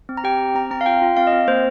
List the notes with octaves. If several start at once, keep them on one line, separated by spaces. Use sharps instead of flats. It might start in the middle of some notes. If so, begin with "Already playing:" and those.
C4
A#5
G4 G5
C4
C4 A#5
C4 A#5
F5
F4 G5
F4
C4 F5
D#5
C4
A#3 C5